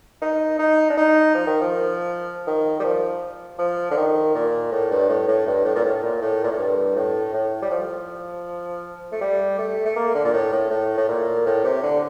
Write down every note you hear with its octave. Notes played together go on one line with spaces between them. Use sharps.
D#4
D#4
D4
D#4
F3
D#3
F3
D#3
G3
F3
F3
D3
D#3
A#2
A2
G2
A2
A2
G2
A2
A#2
A2
A#2
A2
A#2
A2
G2
A2
A2
G3
F3
A3
G3
A3
A3
A#3
D3
A#2
A2
A2
A2
A2
A#2
A2
C3
D3